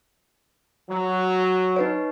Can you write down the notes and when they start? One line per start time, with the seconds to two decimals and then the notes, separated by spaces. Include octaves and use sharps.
0.89 F#3
1.76 D#4 B4 C#5